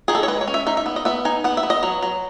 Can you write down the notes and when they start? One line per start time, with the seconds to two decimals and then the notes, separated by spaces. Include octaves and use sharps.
0.08 D#3 G#4
0.15 A4
0.23 C#5
0.28 G#3 B4
0.41 C#5
0.48 C#4
0.54 E5
0.67 D#4 E5
0.77 E5
0.86 B3
0.96 D#5
1.05 B3 E5
1.25 D#4 G#5
1.44 B3 F#5
1.57 E5
1.63 B3
1.70 D#5
1.83 F#3 C#5
2.02 F#3